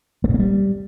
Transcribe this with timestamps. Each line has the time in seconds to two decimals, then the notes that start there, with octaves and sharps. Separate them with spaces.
0.24 A3
0.29 G2
0.34 A#3
0.39 G3